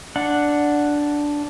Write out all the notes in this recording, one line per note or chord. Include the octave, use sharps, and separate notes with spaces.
D4 F#5